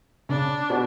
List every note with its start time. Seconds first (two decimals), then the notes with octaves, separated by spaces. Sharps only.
0.29 C#3 D4
0.70 B2